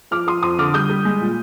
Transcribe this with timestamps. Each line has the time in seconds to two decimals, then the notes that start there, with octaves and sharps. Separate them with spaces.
0.11 F3 D6 F6
0.27 F3 C6 D#6
0.43 F2 C6 D#6
0.58 D3 D6 F6
0.74 G3 D#6 G6
0.90 G3
1.05 G#3
1.21 A#2